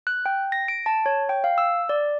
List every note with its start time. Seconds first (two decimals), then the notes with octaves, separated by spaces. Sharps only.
0.07 F#6
0.26 G5
0.52 A#6
0.68 D7
0.86 A5
1.06 C#5
1.29 G5
1.44 F5
1.58 E6
1.89 D5